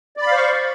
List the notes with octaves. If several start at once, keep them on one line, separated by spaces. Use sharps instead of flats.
C5 D5 F5 B5 C#6